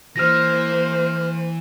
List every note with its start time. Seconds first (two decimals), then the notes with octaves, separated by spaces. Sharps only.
0.16 E3 A#3 C5 F6 A#6